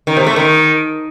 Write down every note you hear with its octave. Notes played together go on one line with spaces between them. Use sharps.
D#3
C3
A3
D#3